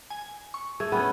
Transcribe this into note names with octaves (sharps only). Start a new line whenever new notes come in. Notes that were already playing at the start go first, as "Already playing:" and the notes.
G#5
C#6
A3 G#4
B3 C#4 G#4